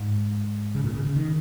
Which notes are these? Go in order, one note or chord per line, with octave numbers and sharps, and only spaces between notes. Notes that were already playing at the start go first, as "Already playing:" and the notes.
Already playing: G#2
C#3
A#2
C#3
C#3
D#3